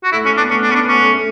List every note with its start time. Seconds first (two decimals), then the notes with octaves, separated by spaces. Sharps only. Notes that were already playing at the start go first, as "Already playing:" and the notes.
0.04 F#4
0.12 A3 E4
0.25 A3 C#4
0.37 B3 D4
0.50 A3 C#4
0.63 D4
0.69 B3 C#4
0.75 D4
0.88 A3 C#4
1.00 A3
1.13 A3